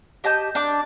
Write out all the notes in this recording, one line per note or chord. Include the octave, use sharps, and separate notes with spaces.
G4 D#5 A5 G6
D4 D6